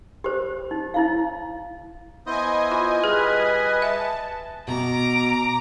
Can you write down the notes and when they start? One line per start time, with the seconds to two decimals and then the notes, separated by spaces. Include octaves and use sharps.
0.24 G4 C5
0.71 D#4
0.94 D#4 E4 F5
2.26 B3 E4 C5 D#5 G#5
2.71 F4
3.04 G3 G#4 B4
3.82 E5 A5
4.68 B2 A#5 D6